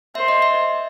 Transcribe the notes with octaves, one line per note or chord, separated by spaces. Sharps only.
C5 E5
D#5
E5